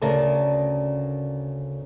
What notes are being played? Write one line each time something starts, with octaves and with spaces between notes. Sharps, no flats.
D2 C#3 A#4 D5 A5